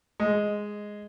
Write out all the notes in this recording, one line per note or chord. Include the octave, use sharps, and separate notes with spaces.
G#3